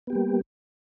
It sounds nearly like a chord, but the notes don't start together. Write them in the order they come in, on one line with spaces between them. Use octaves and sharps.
B3 G4 A#3 G3